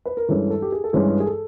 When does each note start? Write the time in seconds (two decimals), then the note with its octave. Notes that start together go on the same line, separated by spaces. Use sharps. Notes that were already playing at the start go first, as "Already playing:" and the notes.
0.05 B4
0.17 A#4
0.28 G2 E3 G#3 C#4 A4
0.50 A4
0.62 G4
0.72 G#4
0.84 A4
0.93 G2 E3 G#3 C#4 G#4
1.20 G#4
1.26 A4